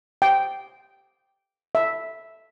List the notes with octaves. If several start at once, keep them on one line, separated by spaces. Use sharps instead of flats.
G5
E5